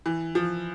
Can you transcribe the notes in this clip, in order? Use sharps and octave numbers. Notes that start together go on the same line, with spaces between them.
E3
F3